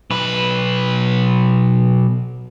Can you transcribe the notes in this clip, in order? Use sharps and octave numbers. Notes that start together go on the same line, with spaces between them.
B1 B4